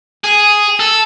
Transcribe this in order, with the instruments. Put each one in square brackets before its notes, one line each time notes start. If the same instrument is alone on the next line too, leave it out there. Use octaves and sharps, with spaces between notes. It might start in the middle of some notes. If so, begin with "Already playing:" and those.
[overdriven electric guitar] G#4
A4